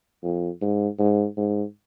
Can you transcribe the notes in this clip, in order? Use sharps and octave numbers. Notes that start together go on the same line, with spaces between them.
F2
G#2
G#2
G#2